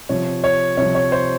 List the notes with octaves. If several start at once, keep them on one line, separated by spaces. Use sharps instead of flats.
C3 F3 C#5
C#5
C3 F3 C#5
C#5
C5